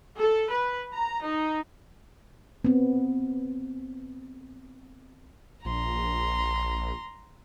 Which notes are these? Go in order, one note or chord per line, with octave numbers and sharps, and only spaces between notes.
A4
B4
A#5
D#4
B3 C4
A#1 A#5 C6